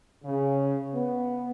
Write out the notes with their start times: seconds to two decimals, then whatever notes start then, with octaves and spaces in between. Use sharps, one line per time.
0.23 C#3
0.94 B3